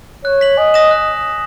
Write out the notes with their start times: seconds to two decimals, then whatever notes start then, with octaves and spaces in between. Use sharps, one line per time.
0.24 C#5 F#6
0.41 B6 F#7
0.57 D#5 G#5
0.74 D#6 A#6 E7
0.91 F#6